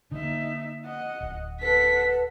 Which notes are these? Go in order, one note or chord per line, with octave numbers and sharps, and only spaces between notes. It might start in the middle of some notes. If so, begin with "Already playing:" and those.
D3 A#3 D#4 E5
D#5 F#5
D1
A4 B4 F#5 B6